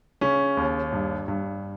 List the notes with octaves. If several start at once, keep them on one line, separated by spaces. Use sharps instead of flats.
C#3 C#4
D#2
G2
G2